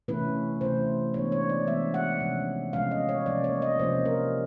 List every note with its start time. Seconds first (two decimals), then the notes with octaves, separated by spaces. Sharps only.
0.08 C3 E3 A3 C#4 E4 B4
0.61 C3 E3 A3 C#4 E4 C5
1.14 E3 G#3 B3 D4 C#5
1.32 C#5
1.49 D5
1.67 E3 G#3 B3 D4 E5
1.94 F#5
2.20 C3 F3 G#3 C#4
2.73 C3 F3 G#3 C#4 F5
2.91 D#5
3.09 C#5
3.26 C3 F3 A#3 C#4 D5
3.44 C#5
3.62 D#5
3.79 C3 F3 A#3 C#4 C5
4.05 A#4